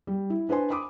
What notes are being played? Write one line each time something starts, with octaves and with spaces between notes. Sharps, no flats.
G3
E4
D4 B4 C5 G#5 C6
B5 C6 D6 D#6